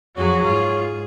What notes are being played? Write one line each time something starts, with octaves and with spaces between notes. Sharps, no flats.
F2 F#3 F#4 G#4 C#5
G#2 F4